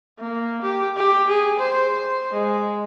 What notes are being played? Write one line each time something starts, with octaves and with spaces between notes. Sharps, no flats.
A#3
G4
G4
G#4
C5
C5
G#3